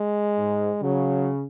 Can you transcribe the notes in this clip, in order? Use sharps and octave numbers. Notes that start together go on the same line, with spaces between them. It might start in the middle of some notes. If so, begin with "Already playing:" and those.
Already playing: G#3
G#2
C#3 F#3